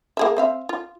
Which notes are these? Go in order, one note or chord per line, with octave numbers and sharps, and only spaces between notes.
A#3 G#4 E5
C4 E5 F5
F4